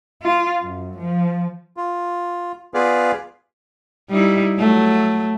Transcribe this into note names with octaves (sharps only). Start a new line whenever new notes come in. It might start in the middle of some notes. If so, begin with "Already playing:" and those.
F4
F#2
F3
F4
B3 F4 G#4 B4 D5 F5
G3 D#4 E4
F#3 A3